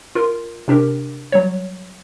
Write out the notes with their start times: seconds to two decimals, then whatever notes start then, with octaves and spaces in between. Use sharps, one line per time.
0.15 F4 A#4
0.68 C3 D4 G4 A#4
1.32 F#3 G3 C#5